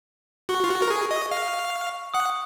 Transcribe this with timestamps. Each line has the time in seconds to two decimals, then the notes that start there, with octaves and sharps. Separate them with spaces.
0.49 F#4 C#6
0.64 F4
0.70 F#4
0.82 A#4
0.90 G#4
1.11 D#5
1.31 F5
2.14 F#5 D#6